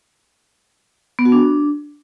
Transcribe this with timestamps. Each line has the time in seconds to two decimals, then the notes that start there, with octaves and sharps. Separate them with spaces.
1.19 B3
1.25 F#4
1.32 D4